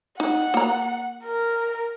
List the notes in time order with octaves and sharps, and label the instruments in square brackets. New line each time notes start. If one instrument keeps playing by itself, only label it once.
[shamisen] D#4 [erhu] F#5
[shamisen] A#3 A#5
[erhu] A#4